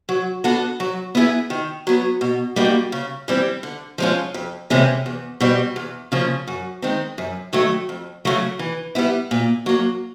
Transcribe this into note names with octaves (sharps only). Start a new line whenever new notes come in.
F#3
B3 D4 F#4 A4
F#3
B3 E4 G#4 B4
D#3
F#3 B3
B2
G3 A#3 D#4 F#4
C#3
E3 G3 C4
D3
F3 G#3 C#4 F4
F2
C3 E3 G#3 C#4
E2
B2 G3 C4
E2
C#3 F3 A#3 C#4
F#2
D#3 G#3 C4
F#2
D#3 F#3 A3
F2
C#3 F#3 A3
E3
G3 B3 E4
A#2
F#3 A#3